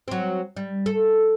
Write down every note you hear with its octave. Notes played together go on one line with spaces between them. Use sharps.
F#3 C4
G3
A4